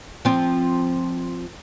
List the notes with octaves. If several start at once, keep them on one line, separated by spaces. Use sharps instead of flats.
F3 C4